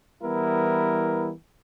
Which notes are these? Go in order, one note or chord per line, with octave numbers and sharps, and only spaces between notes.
E3 G3 B3 E4 A#4